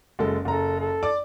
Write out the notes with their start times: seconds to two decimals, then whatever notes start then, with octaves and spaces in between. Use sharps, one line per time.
0.19 F#1 G#3 A4
0.45 F#1 A4 A#5
0.80 A4
1.03 D5 D6